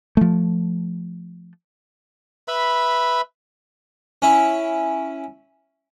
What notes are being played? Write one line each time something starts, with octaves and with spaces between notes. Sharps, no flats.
F3 A3
B4 E5 B5
C#4 E4